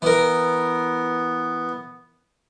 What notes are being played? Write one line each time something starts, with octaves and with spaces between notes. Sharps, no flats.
E3 B3 A#4